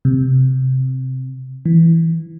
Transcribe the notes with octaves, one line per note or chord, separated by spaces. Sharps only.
C3
E3